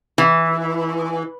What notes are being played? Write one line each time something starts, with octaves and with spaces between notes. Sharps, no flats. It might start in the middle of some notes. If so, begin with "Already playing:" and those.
E3